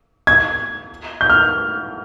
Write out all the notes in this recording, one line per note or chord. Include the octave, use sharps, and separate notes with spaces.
G#6
G6
F6